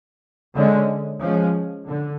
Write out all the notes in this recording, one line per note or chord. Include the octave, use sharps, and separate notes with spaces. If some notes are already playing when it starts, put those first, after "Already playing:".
D3 G#3 C#4
F3 G#3 C#4
D3